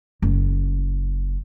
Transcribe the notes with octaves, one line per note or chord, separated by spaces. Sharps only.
F#1